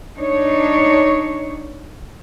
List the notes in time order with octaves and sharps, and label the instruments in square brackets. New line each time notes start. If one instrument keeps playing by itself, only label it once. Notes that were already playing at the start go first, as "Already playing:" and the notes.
[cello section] D4 D#4 C#5